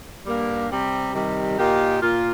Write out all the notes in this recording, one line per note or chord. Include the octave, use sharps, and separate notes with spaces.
G2 G3 A#3
C3 G3 C4
C3 D#3 G3
A#2 A#3 D#4 G4
A#2 A#3 F4